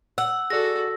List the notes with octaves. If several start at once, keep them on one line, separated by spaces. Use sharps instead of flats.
F#5 E6
F#4 G#4 A4 D5 A#6